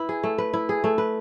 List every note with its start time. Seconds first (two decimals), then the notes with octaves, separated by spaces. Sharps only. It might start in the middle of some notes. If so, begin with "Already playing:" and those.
Already playing: E4 B4
0.09 G#4
0.24 A3
0.38 B4
0.53 E4
0.69 G#4
0.84 A3
0.98 B4